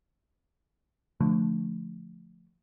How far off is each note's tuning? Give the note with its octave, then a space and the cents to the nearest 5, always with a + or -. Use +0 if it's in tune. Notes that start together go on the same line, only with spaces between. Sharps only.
D3 -15 F3 +0 A3 +0